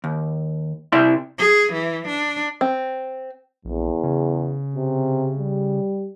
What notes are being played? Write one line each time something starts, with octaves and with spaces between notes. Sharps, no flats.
D#2
C3 E4 D5 E5 C6
G#4
E3
D4
C4
A#1 E2
C#3
C3
G3